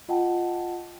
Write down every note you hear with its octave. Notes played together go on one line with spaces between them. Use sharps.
F4 D#5 F#5 G5 A5